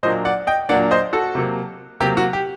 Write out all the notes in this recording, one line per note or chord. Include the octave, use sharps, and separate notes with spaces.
A#2 F#3 A#3 D4 C5 D#5
D5 F#5
D#5 G5
A#2 F#3 A#3 D4 D5 F#5
C5 D#5
F#4 A4
C3 F#3 A#3
C3 F#3 A#3 G4
F#4
G4